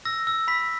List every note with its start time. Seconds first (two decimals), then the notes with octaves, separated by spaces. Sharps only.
0.05 E6 A#6
0.27 E6
0.48 B5 B6